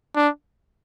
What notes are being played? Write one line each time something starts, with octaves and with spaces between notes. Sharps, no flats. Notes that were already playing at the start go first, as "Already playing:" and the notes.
D4